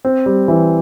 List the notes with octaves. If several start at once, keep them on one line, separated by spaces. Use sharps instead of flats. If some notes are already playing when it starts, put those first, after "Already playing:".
C4
G3
E3